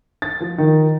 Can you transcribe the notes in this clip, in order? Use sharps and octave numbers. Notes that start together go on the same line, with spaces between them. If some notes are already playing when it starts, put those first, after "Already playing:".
A6
F3
D#3